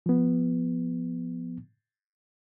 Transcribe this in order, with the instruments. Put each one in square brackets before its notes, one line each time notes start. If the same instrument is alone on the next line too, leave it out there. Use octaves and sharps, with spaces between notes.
[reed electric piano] F3 B3